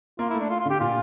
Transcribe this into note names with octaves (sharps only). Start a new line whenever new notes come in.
A#3 F4
A3 E4
D4
F4
F4
D3 G4
A#2 F4